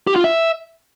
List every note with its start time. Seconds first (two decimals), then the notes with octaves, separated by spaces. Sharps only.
0.07 G4
0.16 F4
0.24 E5